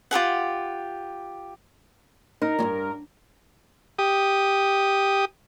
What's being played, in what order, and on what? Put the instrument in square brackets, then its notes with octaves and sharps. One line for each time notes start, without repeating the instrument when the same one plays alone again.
[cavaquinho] F4 G4 G#4 F#5
[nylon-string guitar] D#4 [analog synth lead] A#4
[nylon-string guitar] E2 G2
[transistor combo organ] G4 D#6